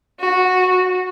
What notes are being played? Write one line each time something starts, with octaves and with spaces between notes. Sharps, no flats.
F#4